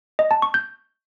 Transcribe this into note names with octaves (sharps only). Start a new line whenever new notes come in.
D#5
A5
C#6
G6